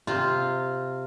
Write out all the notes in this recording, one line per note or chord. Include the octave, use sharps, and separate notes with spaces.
C3 F4